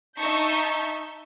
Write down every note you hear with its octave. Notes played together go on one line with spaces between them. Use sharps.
D#4 E5 A5 C#6 G6